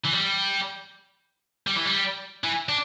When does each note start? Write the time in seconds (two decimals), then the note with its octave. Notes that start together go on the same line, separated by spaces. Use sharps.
0.04 E3
0.13 G3
1.67 G3
1.77 E3
1.86 G3
2.44 E3
2.69 D4